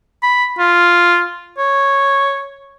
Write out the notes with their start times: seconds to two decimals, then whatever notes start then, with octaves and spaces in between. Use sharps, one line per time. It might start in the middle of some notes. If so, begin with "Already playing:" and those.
0.23 B5
0.59 F4
1.58 C#5